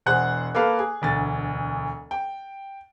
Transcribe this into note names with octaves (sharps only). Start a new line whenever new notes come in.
E1 G#4 C5 F#5 F#6
A#3 A4 B4 F5
G#4
E1 D2 A6
G5